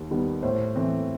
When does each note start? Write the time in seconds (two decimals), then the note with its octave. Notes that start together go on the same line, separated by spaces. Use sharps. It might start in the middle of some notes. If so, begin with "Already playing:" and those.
Already playing: D#2
0.11 D#3 G3 B3
0.43 A2 C5
0.76 E3 A3 C4